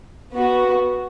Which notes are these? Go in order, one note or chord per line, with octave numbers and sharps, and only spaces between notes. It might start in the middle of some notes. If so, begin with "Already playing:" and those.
B3 F#4